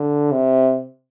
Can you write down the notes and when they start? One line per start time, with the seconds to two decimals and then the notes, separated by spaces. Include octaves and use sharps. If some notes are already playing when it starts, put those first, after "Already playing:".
Already playing: D3
0.32 C3